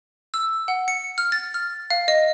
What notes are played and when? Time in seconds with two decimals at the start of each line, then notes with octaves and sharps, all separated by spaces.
0.34 E6
0.68 F#5
0.88 C#7
1.18 F6
1.32 A6
1.54 F6
1.90 F5
2.08 D#5